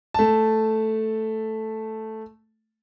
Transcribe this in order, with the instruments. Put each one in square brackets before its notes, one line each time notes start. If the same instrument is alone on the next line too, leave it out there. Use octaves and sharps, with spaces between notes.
[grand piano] A3 A5